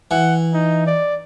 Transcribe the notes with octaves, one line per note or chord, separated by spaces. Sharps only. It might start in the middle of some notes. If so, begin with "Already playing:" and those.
E3 F#5
D#4
D5